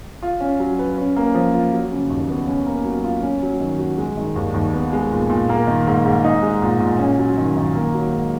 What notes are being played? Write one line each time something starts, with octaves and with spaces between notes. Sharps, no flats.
F4
C#4
F#3
B4
C#4
A#3
F3
F4
F#3
C#3
D#2
B3
C#4
A#3
F#3
F4
C#4
F#3
D#3
F#4
G#3
D#3
D#2
D#2
B3
G#3
A#2
A#2
A#3
D#3
G#2
G#2
D#4
G#3
A#2
A#2
C#4
F#3
D#3
D#3
A#3
F#3
G#2